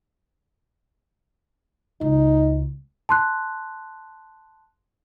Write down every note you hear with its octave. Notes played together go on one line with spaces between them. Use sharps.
C#2 D#4
A5 C6 F#6